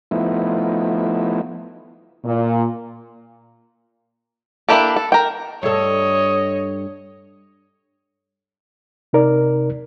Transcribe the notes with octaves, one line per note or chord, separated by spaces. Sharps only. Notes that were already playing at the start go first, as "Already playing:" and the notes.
F3 A3 B3 D#4 E4
A#2
A#3 D4 E4 G4 A4
A4
A#4 G5
G2 A4 C#5 D#5
C3 D#4 A#4 D5